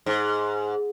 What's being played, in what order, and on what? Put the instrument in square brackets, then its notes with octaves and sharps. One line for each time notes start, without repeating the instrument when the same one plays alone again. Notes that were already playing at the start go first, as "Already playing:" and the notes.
[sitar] G#2